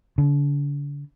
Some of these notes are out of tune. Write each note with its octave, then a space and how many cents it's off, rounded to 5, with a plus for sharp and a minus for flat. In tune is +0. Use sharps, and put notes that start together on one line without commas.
D3 -40